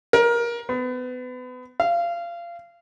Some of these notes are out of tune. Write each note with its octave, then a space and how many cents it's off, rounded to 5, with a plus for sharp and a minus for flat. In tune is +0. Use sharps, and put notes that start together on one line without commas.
A#4 +20
B3 +30
F5 -25